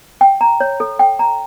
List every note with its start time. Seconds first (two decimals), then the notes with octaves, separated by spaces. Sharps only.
0.21 G5
0.41 A#5
0.60 C#5
0.80 A4
0.99 G5
1.19 A#5